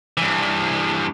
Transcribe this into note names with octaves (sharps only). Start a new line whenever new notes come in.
G2 E3